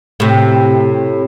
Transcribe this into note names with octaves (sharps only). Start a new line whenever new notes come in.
A2 C3